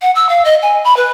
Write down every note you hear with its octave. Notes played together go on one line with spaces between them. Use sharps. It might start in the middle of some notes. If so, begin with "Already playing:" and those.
F#5
E6
F5
D#5
G#5
B5
B4